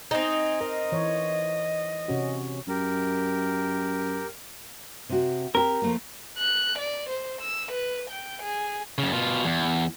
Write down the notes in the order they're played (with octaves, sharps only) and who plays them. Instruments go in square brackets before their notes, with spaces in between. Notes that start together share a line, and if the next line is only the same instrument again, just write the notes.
[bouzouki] C4 D#4 [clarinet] G#5
[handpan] A#4 [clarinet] D#5
[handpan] E3 C#5
C3 C#4 F#4
[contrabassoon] F#2 [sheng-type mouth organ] G4 A#4
[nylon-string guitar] C3 F#4
[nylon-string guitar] C4 G4 [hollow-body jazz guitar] A#4
[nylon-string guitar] F3 A3 A#3
[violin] F#6
D5
C5
E6
B4
G5
G#4
[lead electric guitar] F#2 C#3
B2 F4
E2